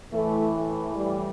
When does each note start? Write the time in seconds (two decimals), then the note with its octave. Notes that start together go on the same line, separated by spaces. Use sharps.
0.13 A2 E3 A3
0.54 A3
0.96 G3